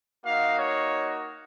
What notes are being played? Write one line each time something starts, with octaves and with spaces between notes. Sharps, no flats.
A#3 D#4 F#4 F5
C#5